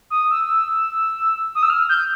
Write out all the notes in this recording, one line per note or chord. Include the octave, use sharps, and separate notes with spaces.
D#6
E6
D#6
E6
F6
G6